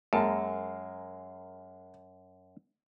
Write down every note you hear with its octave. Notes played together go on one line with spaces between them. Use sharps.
F#2 G#3 A#3 A5